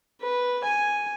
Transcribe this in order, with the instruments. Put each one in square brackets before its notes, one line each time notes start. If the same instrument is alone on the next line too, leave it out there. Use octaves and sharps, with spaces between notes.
[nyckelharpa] B4
G#5